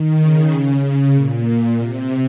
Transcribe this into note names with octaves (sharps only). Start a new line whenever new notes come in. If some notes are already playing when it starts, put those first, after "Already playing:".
Already playing: D#3
C#3
A#2
C3